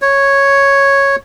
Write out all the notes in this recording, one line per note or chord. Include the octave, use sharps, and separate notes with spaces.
C#5